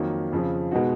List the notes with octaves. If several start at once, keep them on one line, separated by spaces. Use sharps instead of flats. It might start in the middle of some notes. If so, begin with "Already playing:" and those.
Already playing: F2 D#3 F#3 A#3
F2 C#3 F3
B2 G#3 B3 D#4 F#4